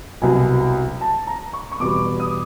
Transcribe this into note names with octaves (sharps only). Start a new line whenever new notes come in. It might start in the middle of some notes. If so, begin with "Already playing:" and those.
C2 B2 F#3 G#5
A5
A#5
C#6
C#6
E2 B2 G3 B3 D6
D#6